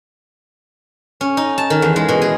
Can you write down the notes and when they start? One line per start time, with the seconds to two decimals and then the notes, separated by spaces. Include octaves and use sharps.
1.21 C#4
1.37 D#4
1.58 A5
1.70 D#3
1.82 E2
1.96 G#3
2.08 B2
2.22 G#4